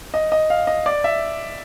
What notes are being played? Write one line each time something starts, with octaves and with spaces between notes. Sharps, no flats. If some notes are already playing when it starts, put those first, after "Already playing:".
D#5
D#5
F5
D#5
D5
E5